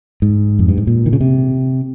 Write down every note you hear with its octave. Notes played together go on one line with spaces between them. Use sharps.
G#2
F2
G2
G#2
A#2
D#3
C#3
C3